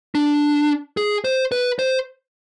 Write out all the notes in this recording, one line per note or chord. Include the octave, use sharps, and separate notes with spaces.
D4
G#4
C5
B4
C5